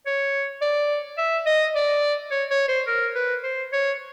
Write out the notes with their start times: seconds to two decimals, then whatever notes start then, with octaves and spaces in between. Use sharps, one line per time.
0.06 C#5
0.61 D5
1.18 E5
1.46 D#5
1.75 D5
2.31 C#5
2.51 C#5
2.68 C5
2.87 A#4
3.15 B4
3.43 C5
3.73 C#5